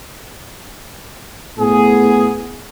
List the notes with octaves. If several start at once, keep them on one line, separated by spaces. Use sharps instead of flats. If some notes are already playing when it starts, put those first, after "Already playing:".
A2 B3 G#4